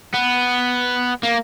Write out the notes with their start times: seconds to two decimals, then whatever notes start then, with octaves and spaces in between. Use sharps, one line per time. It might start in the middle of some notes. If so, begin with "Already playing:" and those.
0.14 B3
1.23 A#3